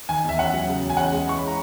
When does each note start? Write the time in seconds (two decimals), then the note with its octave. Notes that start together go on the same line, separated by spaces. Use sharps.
0.09 D#3 G#5
0.24 E2 E5
0.38 C#4 F#5
0.54 F#3
0.67 C#3
0.83 E2
0.90 G#5
0.97 C#4 F#5
1.12 G#3
1.27 E3 C#6
1.38 B5
1.47 A#5